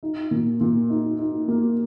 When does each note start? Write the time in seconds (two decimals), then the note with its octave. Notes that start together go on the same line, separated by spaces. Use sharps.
0.03 D#4
0.31 A#2
0.61 A#2
0.90 D#4
1.19 D#4
1.48 A#3